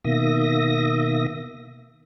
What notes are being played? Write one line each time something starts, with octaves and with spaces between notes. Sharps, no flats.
B2 D#3 A#3 E5 D#6 A#6